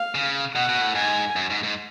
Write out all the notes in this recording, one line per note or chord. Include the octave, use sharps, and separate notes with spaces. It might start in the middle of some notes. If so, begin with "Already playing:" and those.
Already playing: F5
C#3
B2 F#5
B2
A2
G#2 G#5
F#2
G#2
G#2